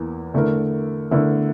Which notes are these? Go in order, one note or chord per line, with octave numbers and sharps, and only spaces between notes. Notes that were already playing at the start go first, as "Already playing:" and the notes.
Already playing: E2 E3 A#3
D3 A3 E4 A#4
D3 A3 E4 A#4